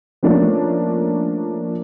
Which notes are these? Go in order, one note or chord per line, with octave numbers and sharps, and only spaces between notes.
F3 A3 A#3 C#4 D4